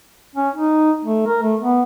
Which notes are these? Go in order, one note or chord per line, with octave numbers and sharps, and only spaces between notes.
C#4
D#4
A3
A#4
A3
B3